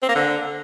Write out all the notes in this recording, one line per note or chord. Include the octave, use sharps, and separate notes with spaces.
C4
A#3
D3